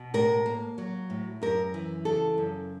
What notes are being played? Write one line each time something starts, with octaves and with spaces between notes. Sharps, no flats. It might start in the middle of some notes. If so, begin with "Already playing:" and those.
Already playing: B2
A2 A#4
A#3
F#3
A2
F#2 A#4
E3
C#3 A4
F#2